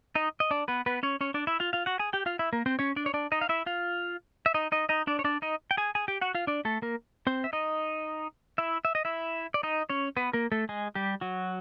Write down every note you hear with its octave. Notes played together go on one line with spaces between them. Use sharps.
D#4 D#5
D#5
D4 D5
B3 B4
B3 B4
C#4 C#5
C#4 C#5
D4 D5
E4 E5
F4 F5
F4 F5
F#4 F#5
G#4 G#5
G4 G5
F4 F5
E4 E5
A#3 A#4
C4 C5
C#4 C#5
D4 D5
C#5
D4 D5
D#4 D#5
F5
E4 E5
F4 F5
E5
D#4 D#5
D#4 D#5
D#4 D#5
D4 D5
C#5
D4 D5
D#4 D#5
G5
G#4 G#5
G#4 G#5
G4 G5
F#4 F#5
F4 F5
D4 D5
A3 A4
A#3 A#4
C4 C5
E5
D#4 D#5
E4 E5
E5
D#5
E4 E5
D5
D#4 D#5
C#4 C#5
B3 B4
A#3 A#4
A3 A4
G#3 G#4
G3 G4
F#3 F#4